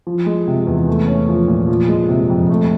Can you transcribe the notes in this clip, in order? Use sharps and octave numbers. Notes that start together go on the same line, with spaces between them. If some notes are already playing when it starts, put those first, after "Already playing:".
F3
G#3
C3
E2
A3
C#4
F3
A#2
F3
G#3
C3
F2
A3